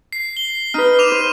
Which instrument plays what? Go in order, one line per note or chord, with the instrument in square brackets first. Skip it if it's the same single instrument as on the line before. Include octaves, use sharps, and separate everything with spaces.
[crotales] C7
G7
[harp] D#4 B4 [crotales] F6
[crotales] D6 D#7 F7
[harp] C5